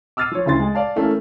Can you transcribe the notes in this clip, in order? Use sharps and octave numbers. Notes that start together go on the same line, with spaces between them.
D6 E6 F6 A6 C7 D#7
F3 C#5
D2 C#3 E4 C6 A6
G#3
D5 F5 A5
E3 A3 A#3 C#4 A4